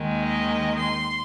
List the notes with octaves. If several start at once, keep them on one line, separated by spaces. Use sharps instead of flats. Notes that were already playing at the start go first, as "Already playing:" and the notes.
Already playing: D#2 D#3 G#3
D#5
C6